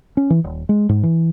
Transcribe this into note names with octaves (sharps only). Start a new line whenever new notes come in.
C#4
E3
D#1
G#3
G#2
E3